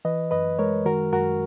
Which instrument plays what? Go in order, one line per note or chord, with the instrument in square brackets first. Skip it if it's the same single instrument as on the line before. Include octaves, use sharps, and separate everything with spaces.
[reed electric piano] E3 B4 D#5
F#2 B4 D#5
G#3 A#4 C#5
D#3 F#4 A#4
F#2 F#4 A#4